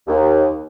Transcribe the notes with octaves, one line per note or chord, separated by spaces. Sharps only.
D#2